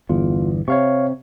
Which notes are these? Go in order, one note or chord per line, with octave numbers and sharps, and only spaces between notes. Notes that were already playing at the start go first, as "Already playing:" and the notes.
G1 E2 F4
C3 C#5 F5 C#6